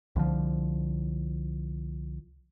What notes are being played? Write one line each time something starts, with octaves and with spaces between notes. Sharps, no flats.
C2 D3 F3